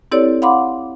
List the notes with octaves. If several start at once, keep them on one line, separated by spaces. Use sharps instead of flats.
C4 E4 G4 A4 C#5 D5
F5 F#5 B5 C6 D6